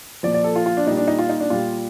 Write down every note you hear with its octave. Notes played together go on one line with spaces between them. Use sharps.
A#2 F3 D5
D5
A4
F4
F4
D4
A#2 G3 D#4
D4
D#4
F4
D#4
D4
A#2 G3 F4